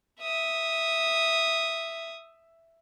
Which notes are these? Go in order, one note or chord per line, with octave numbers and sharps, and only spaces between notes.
E5 D#6